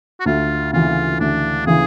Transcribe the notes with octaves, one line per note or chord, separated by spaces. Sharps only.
F#4
D2 F4
C#3 E3 F4
D2 D4
C#3 E3 G#4